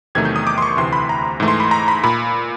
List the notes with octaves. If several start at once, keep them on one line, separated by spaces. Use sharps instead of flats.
E2 C3 D#3 F#3 A3 G#6
G6
D#6
D6
C6
C#6
D2 C3 E3 C6
B5
A#5
G#2 E3 A3
C6
B5
A#5
B5
A#2 B5